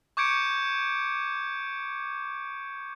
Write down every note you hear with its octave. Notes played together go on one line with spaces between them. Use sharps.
C#6 D6 G6 G#6 C#7 D7